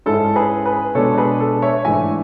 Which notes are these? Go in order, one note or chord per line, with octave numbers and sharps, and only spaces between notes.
G#2 G#3 C#4 E4 A4
G#4 B4
G#4 B4
B2 G#3 D4 A4 C#5
G#4 B4
A4
C#5 E5
G#2 E3 A3 D4 E5 G#5